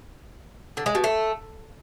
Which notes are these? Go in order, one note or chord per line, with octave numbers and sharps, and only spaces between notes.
D3
G#3
B2
A3